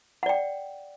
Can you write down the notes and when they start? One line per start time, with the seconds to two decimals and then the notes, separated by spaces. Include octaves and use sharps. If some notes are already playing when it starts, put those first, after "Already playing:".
0.23 F#5
0.26 D5
0.29 G5